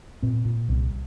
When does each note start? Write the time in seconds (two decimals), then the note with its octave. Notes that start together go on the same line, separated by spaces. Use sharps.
0.23 A#2 C4
0.45 A#2
0.69 C2